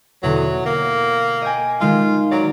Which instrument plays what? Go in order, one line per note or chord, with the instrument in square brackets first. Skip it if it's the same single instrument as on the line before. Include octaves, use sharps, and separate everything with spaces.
[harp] E2 B2 D3 [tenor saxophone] F#3
[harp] D#6
[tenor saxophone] A#3
[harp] D#5 G5 G#5
[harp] D#3 G#3 D#4 [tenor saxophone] F4
[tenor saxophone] F#3 [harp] D5 A#5 D6